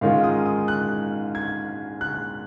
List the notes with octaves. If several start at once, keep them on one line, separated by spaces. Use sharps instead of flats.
G#2 D#3 G#3 C#4 F4 F5
D#6
D#6
F#6
G#6
F#6